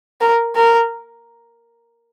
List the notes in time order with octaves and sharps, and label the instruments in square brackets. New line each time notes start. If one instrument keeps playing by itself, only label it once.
[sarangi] A#4
A#4